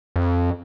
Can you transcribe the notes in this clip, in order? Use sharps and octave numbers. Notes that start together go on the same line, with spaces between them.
F2